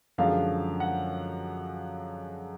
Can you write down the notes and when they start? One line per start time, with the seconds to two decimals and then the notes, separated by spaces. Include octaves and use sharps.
0.18 F#2 D3 F3 G#3 F5
0.80 F#5